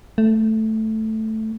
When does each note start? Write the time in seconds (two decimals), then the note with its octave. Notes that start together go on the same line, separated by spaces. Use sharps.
0.18 A3